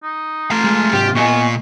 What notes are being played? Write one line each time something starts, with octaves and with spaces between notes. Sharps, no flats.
D#4
A3 F4 A#5
G#3
G#2 C3 F#3 G4
A#2 B3 F4 D#5 G#5 C#6